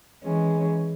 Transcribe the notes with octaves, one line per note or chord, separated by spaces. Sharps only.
E3 G#3 C#4